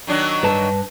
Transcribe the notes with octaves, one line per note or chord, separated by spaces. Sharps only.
D#3 F#3 D4
G2 B4 A5